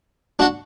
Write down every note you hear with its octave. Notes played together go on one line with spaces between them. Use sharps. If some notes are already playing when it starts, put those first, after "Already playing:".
D4 F#4